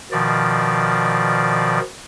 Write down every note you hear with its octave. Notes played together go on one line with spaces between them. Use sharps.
B2 D#3 F3 D5